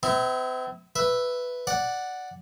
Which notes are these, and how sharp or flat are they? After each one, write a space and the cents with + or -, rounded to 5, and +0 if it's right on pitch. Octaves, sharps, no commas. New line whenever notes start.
C4 -45 E4 -20
B4 +0 E5 +0
D5 +0 F#5 +0